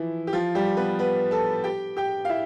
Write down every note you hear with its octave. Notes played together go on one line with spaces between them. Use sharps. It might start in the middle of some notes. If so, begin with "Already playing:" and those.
Already playing: E3 F3 E4
G4
F3 F4
G3 G4
B3 B4
B3 B4
A4 A5
G4 G5
G4 G5
F5
E4 E5